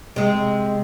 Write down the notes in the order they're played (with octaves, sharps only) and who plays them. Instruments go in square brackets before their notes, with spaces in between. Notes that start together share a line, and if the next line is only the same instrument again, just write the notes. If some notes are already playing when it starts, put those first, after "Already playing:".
[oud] C3 G#3